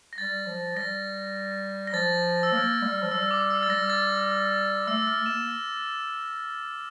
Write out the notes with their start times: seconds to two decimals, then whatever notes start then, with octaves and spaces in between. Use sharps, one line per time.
0.13 A#6
0.18 G3 A6
0.47 F3
0.76 G3 A#6
1.87 A#6
1.94 F3 A6
2.43 E6
2.53 A#3 F6
2.82 G3
3.03 F3
3.11 G3 E6
3.22 E6
3.31 D6
3.50 E6
3.63 A6
3.69 G3 A#6
3.90 A6
4.87 A3 E6
5.07 F6
5.16 A3
5.26 A#3 E7